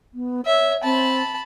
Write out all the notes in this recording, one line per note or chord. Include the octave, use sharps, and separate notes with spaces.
B3
C#5 E5
C4 A5 B5